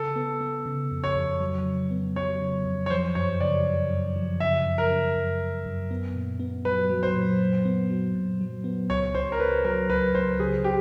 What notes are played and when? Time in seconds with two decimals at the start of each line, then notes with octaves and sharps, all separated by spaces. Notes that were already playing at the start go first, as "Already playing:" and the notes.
Already playing: C#3 A4
0.16 B3
0.41 B3
0.66 C#3
0.91 F2
1.04 C#5
1.16 F2
1.41 F#3
1.65 C#3
1.91 B3
2.16 F#3 C#5
2.41 C#3
2.65 F2
2.86 C#5
2.90 F3 C5
3.15 F#2 C#5
3.40 C#3 D5
3.65 F#2
3.90 F#2
4.16 F3
4.40 C#3 E5
4.66 F#2
4.78 A#4
4.91 C#3
5.16 F#2
5.41 F#2
5.66 F#2
5.91 B3
6.15 A#2
6.40 B3
6.65 F#3 B4
6.89 F#3
7.03 C5
7.15 A#2
7.39 A#2
7.65 B3
7.89 F#3
8.15 A#2
8.40 F#3
8.64 B3
8.90 C#2 C#5
9.15 C#2 C5
9.32 A#4
9.40 C#2 B4
9.64 F#3 A#4
9.90 C#2 B4
10.14 C#2 C5
10.39 C#3 G#4
10.64 G4